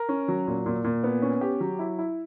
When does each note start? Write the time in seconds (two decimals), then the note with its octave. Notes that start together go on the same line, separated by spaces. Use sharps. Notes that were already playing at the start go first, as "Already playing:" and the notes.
Already playing: A#4
0.09 C#4
0.28 F#3
0.47 A#2
0.66 A#2
0.84 A#2
1.04 B3
1.22 C#4
1.41 G4
1.60 F#3
1.79 E4
1.99 E4